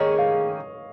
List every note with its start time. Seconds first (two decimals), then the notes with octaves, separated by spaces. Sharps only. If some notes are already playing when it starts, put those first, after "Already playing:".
Already playing: D#3 A#3 C#4 G#4 C#5 D#5
0.18 F5